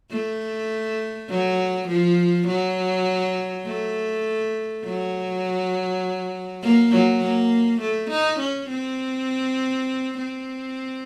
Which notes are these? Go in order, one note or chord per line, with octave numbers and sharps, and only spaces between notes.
A3
F#3
F3
F#3
A3
F#3
A#3
F#3
A#3
A3
D#4
C#4
C4
C4